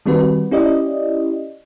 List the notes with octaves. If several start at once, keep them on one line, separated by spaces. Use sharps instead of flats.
D#3 G3 C4 F#4 B4
C#4 E4 G4 D5 D#5